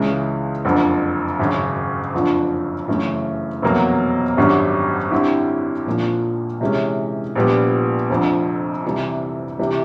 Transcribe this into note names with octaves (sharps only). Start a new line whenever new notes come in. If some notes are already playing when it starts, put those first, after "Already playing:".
Already playing: C#2 C#3 E3 G#3
F#1 F2 D3
G#1 F#2 C#3
F#1 F2 D3 F3
F#2 C#3 E3 A3
F1 E2 B2 F#3 A#3
G#1 F#2 D3 G3
D3 G3 C4 E4
A#1 A#2 F3 A#3
C3 E3 G#3 C#4
A#1 A#2 G3 B3
F1 F2 D3
C2 C3 E3 G3
C3 E3 G3